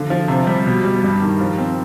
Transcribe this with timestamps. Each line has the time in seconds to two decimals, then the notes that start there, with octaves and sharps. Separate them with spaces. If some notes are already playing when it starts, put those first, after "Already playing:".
Already playing: D3 F3
0.10 F3
0.28 C3
0.47 G3
0.66 B2
0.84 G3
1.03 G2
1.22 D#3
1.40 F3
1.58 C4